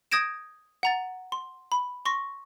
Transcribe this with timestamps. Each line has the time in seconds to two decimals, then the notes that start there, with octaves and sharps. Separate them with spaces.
0.11 D#6 G6 G#6 A#6 D7 E7
0.83 F#5 A#5 A6
1.32 C6
1.72 B5
2.05 C6 C#6 A#6